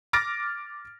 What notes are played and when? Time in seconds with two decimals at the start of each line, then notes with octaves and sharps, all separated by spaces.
0.13 D6 F6 A6 A#6 D7